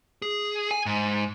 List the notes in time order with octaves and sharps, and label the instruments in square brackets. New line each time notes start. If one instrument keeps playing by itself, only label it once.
[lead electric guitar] G#4
G#5
G#2